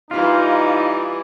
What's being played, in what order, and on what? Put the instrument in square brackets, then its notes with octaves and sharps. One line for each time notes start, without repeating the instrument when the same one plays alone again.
[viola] E3 G3 [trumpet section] D#4 [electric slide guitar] F4